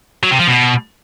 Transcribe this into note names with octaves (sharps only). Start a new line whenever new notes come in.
F#3
C3
F3
B2